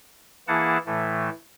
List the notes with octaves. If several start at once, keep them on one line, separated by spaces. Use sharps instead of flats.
E3 A#3 E4 G#4 F#5 A5
A2 E3 A3